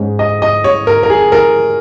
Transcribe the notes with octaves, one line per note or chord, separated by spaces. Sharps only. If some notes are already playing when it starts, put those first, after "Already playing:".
Already playing: G#2 G#3 C#4
D#5
D#5
C#5
A#4
A#4
G#4
A#4